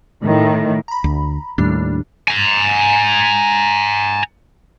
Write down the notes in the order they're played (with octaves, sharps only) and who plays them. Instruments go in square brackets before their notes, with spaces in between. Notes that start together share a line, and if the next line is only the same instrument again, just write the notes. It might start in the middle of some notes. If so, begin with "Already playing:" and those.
[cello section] A2 D#3
[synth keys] A#5 B5
[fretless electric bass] D2
[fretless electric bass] D#2 A2 [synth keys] G3 D4
[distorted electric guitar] G#5 A#5